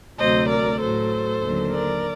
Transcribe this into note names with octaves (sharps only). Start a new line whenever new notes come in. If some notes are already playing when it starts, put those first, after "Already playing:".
D2 C3 F#3 C5 D#5
A#4 D5
A2 F#3 A4 C5
D#2 D3 F#3
A#4 D5